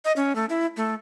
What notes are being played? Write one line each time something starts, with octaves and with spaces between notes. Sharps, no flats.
D#5
C#4
A3
E4
A3